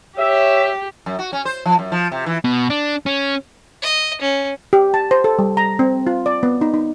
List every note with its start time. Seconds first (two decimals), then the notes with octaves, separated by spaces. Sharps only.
0.18 G4 C#5 E5
1.06 F#2
1.19 F#4
1.33 C#4
1.45 C5
1.65 F3
1.79 F#2
1.92 F3
2.12 C3
2.26 E3
2.44 B2
2.70 D4
3.06 C#4
3.82 D#5
4.21 C#4
4.73 G4
4.94 A5
5.11 C5
5.24 A4
5.39 G3
5.57 A#5
5.79 C4
6.07 F4
6.26 D5
6.43 B3
6.61 D#4
6.74 D#4